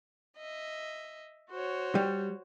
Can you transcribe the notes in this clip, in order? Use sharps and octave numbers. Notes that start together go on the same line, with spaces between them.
D#5 E5
F#4 C5 C#5
G3